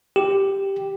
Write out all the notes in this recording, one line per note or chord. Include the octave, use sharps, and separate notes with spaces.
G4